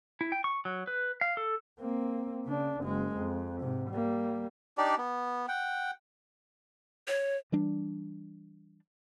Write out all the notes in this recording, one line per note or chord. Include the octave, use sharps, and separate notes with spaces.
E4
G5
C#6
F#3
B4
F5
A4
A#3 C4
C#3 D4
F#1 G#3
F2
G#2 C3
G3 A#3
D4 D#4 G4 D5
B3
F#5 G5
C#5
E3 G3 D4